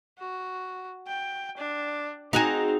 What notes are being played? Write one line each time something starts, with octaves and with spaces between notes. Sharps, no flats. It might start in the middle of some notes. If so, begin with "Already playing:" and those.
F#4
G5
D4
C4 D#4 F#4 G#4